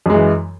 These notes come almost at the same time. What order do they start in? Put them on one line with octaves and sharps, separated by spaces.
F#2 G#3 E3